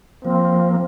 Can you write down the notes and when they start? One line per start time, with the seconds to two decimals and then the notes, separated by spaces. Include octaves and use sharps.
0.25 F3 A#3 C4